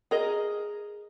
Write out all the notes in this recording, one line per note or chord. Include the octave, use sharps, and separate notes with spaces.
G#4 A#4 D#5